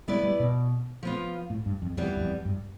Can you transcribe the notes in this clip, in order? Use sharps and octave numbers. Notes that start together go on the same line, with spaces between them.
G3 B3 E4 B4 D5
G3
B2
F3 B3 F4
A2
G2
F2
F2 E3 G3 B3
E2
F2
G2